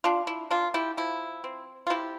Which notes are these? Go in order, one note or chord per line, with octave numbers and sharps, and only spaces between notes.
G3 D4 F4
E4
A#3 D4 F4
E4 G4
F3 E4
C4
F4
C3 E4 G4